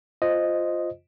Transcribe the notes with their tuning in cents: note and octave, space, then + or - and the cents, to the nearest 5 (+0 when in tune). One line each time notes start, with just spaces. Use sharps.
F4 +0 C5 +0 D#5 +0